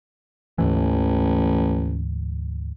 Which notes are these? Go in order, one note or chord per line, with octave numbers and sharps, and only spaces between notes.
A1 D2 G#2 E3